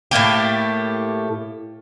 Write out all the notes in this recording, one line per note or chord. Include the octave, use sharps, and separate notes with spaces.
A2 A3 A#3 G4